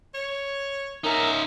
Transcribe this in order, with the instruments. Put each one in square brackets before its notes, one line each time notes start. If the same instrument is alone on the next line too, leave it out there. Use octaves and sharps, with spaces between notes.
[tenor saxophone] C#5
[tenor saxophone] C#4 [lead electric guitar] D#4 E5 [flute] A#4